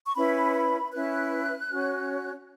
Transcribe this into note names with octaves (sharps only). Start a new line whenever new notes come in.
C#6
C#4 E4 B4 B5
B5
C#4 E4 B4 F#6
C#4 F#4 C#5